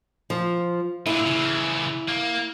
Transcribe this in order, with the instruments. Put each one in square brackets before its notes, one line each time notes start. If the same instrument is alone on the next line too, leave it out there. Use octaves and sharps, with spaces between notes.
[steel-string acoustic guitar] F3
[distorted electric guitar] A#2 D3 [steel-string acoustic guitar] E4
[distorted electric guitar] C#3 E3
A#3